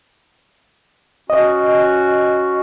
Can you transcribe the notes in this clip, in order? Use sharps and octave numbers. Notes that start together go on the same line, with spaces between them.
C#4 F#4 D#5